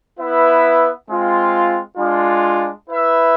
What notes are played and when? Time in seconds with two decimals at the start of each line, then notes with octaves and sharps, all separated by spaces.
0.19 B3 E4 B4 E5
1.08 G#3 C4 F4
1.97 G#3 D4 F4
2.88 E4 B4 E5